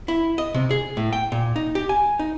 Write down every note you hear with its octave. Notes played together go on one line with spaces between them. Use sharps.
E4
D#5
C3
G#4
A2
G5
A#2
D#4
G4
G#5
D#4